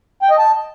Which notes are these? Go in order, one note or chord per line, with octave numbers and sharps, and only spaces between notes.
G5
D#5
A5